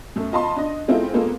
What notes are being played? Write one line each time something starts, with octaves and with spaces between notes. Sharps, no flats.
F#2 A3 A4
F4 D#5 A5 B5 C6
D4 D#5
G#3 C4 E4 F4 A4
G#3 A#3 B3 F4 A4